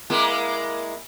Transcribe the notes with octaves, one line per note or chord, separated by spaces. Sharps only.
G#3 A#3 E4